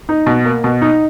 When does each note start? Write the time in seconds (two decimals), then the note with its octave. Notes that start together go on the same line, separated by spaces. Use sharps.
0.09 D#4
0.26 B2
0.45 A#3
0.64 B2
0.82 D#4